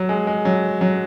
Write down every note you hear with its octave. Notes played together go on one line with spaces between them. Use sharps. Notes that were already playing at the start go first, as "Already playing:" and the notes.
Already playing: F#3
G#3
G#3
F#3
F#3